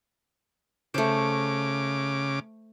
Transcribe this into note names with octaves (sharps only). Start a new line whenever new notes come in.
C#3 A3 C5 D6